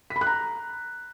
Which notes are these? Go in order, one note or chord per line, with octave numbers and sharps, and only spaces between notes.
B6
B5
F#6
A#5